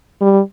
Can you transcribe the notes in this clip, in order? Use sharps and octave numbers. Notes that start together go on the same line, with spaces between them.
G3